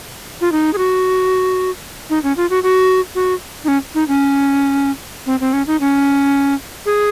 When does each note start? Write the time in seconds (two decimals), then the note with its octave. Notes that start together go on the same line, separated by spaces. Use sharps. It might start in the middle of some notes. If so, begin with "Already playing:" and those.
0.41 F4
0.52 D#4
0.73 G#4
0.78 F#4
2.10 D#4
2.23 C#4
2.37 F4
2.50 F#4
2.63 F#4
3.15 F#4
3.64 D#4
3.68 C#4
3.95 D#4
4.08 C#4
5.26 C4
5.40 C4
5.53 C#4
5.67 D#4
5.80 C#4
6.86 G#4